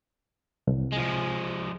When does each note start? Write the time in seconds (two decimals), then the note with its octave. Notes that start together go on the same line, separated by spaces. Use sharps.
0.67 C2
0.93 F3 G#3